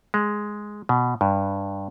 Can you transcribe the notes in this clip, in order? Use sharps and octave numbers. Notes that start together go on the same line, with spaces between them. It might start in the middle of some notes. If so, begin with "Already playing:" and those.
G#3
B2
G2